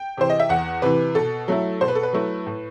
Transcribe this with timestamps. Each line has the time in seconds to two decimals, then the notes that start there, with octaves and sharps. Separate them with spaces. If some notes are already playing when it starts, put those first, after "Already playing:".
Already playing: G5
0.17 C3 E3 C5
0.30 D#5
0.40 E5
0.49 E2 F#5
0.82 C3 E3 B4
1.15 B2 A4
1.48 F#3 A3 E4
1.81 B2 C5
1.88 B4
1.95 A4
2.03 B4
2.13 F#3 A3 E4
2.46 A2